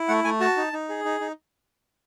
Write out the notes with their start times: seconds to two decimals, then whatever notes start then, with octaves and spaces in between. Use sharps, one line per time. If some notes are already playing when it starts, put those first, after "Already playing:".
Already playing: E4
0.08 A3 F#5
0.24 A3 G#5
0.40 F#4 A5
0.57 D#4
0.73 D#4
0.89 G#4
1.05 D#4
1.20 D#4